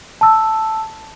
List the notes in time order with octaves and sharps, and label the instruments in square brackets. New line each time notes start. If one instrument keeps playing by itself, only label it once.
[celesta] A5 E6